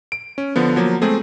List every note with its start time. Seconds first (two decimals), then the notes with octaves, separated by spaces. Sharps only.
0.12 D7
0.38 C#4
0.56 D3 F3 B3
0.76 F3 F#3 A#3
1.01 G#3 A3 C4 G#4